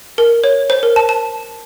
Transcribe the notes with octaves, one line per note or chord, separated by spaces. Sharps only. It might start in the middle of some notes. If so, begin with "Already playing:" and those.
A#4
C#5
C5
A#4
A5
A5